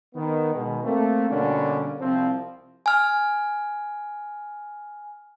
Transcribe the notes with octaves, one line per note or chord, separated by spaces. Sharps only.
D#3 B3
B2 D#3 G#3
A3 A#3 C4
B2 D3 G3 A#3 C#4 D4
C2 F3 C4
G#5 F6